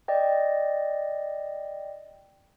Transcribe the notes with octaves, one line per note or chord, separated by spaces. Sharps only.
D5 D#5 G5